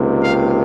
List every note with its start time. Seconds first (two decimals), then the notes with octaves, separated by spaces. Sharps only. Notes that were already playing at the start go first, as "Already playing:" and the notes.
Already playing: C#2 C3 D#3 A#3
0.24 F5